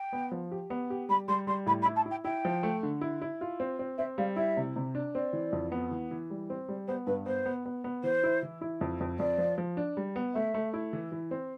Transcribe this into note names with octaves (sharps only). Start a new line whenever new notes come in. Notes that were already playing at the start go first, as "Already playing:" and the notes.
Already playing: G5
B3
F3
G4
B3
G4
G3 B5
G3 C6
G3 C6
A2 B5
B5
E4
A5
E4
G5
E4 G5
F3
A3
D3
E4
E4
F4
C4
C4
C4 E5
G3 F5
E4 E5
C3
C3
D4
C4 D5
E3
F2
B3
E3
E3
G3
C4
G3
B3 C5
G2 B4
B3 C5
B3
B3
B3
E3 C5
E4
E3
E4
F2
F2
F2 D5
F3
F3
D4
G3
B3
A3 E5
A3
E4
E3
E3
C4